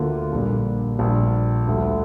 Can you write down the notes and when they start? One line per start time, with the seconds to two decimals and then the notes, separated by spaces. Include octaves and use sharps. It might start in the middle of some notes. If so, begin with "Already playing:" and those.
Already playing: D2 D3 A#3 F4
0.32 A#1 A#2 G3 A#3 D4
0.99 A#1 A#2 G3
1.67 D2 D3 G3